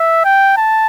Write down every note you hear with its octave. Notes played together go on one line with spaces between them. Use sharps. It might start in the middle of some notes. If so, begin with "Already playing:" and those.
Already playing: E5
G5
A5